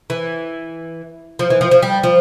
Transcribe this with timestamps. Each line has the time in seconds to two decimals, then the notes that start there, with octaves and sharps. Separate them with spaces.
0.10 E3
1.39 F3
1.50 E3
1.61 F3
1.71 F3
1.83 G3
2.03 F3